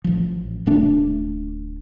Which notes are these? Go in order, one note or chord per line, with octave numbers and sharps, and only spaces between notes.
A1 F3
D1 B2 A3 D4